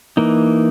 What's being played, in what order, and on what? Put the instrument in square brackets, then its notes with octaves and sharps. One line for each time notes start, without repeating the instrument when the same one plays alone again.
[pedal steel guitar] E3 A#3 D#4